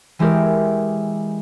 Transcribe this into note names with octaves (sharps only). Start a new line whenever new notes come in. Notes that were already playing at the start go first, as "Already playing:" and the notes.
E3 G#3 E4 G4 A#4